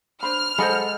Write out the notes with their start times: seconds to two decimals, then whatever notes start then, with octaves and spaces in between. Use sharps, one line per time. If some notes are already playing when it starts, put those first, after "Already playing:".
0.23 D4 C5 B5 F6
0.58 G#3 A4 C5 D#5 F#5 B5